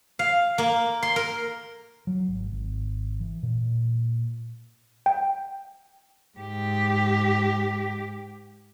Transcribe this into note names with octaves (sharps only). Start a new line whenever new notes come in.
F5
A#3
C6
A#4
F#3
G#1
G#1
E3
A#2
G5
G#2 G4